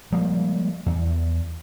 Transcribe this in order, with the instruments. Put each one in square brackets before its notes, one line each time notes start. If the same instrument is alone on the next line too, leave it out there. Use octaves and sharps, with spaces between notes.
[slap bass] F3 G3 G#3 A#3
E2